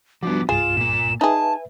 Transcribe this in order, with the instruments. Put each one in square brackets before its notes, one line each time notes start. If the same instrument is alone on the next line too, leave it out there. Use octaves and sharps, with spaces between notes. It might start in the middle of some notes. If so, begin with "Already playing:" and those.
[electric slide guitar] F3 B3 [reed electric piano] G3 D4 F#4 [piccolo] D6
[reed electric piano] C2 G2 [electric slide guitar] F4 [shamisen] G#4 [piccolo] E7
[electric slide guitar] A#2 A#3
[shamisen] D#4 G#4 [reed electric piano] B4 E5 [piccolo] G#5 [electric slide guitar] A5